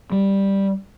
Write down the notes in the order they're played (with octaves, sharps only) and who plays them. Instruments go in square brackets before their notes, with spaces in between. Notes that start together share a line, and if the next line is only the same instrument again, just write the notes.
[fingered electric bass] G3